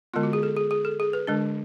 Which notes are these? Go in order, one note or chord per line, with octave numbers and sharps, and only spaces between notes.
D3 G#3 B3 F4
F#4
G#4
A4
G#4
G#4
A4
G#4
B4
D3 G#3 D4